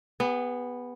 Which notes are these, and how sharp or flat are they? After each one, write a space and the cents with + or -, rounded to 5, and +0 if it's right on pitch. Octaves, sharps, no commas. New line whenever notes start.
B3 +0 G#4 -45